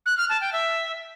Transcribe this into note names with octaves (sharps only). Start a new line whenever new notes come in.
F#6
F6
A5
G5
E5